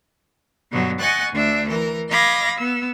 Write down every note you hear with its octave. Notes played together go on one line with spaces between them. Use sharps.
G2 B2 D3 F#3 B3
D#5 F#5 G#5 C#6 F#6 A6
D2 D4 E5
E3 A#4
D#5 F5 B5 D6 G#6 A#6
B3 E6